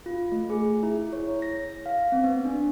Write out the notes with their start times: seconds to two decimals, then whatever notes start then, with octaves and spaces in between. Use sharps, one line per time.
0.06 F4
0.32 A3
0.50 G#4
0.83 E4
1.13 C#5
1.42 A#6
1.86 F5
2.12 C4
2.24 B3
2.45 D4